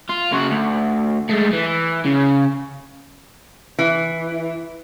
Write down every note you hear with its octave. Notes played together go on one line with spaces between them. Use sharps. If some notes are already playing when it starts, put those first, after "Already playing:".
F4
C#3 F#4
D2
G#3 A3
E3
C#3
E3